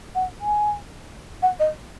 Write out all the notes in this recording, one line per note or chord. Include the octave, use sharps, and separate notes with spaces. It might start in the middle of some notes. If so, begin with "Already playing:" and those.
F#5
G#5
F#5
D#5